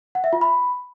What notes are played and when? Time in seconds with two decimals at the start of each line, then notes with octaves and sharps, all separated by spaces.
0.15 F#5
0.24 E5
0.33 F4
0.41 B5